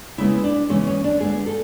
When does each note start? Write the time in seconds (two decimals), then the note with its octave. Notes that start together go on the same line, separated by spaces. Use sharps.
0.18 C#3 G#3 B3 E4
0.44 D4
0.69 C#3 E3 G#3 B3 C#4
0.87 C#4
1.04 D4
1.20 D3 G#3 B3 G#4
1.46 A4